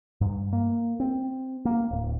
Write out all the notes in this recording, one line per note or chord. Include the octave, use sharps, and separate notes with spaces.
G2
A#3
C4
A#3
D1